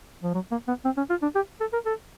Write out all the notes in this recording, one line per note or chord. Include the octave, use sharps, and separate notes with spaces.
F3
F#3
A#3
B3
C4
C#4
F4
D4
G4
A4
A#4
A4